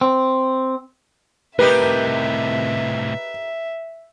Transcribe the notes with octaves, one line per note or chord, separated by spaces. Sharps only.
C4
A2 C3 D#4 G4 A#4 B4 E5